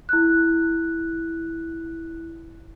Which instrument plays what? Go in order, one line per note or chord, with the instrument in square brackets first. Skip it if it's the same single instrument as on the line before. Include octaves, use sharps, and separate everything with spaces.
[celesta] E4 F#6